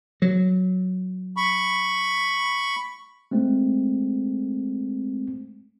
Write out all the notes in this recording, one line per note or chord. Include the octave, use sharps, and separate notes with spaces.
F#3
B5 C#6
G#3 A3 C4